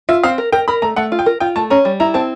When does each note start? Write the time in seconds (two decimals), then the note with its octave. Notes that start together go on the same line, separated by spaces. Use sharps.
0.09 F4 E5
0.23 C4 F5
0.38 A#4
0.52 A#4 G5
0.68 A#4 B5
0.82 A3 A#5
0.96 A3 F#5
1.12 F4
1.19 G5
1.26 A#4
1.40 F4 G5
1.56 A3 A5
1.70 C#4 A#5
1.85 G3
2.00 E4 A#5
2.14 C4 A5